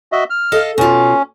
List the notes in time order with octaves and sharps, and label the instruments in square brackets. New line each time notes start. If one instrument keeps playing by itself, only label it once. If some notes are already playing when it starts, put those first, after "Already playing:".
[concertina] F#4 D#5 E5
F6
[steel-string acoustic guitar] A4 D#5 F5
[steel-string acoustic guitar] B2 F4 [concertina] C#4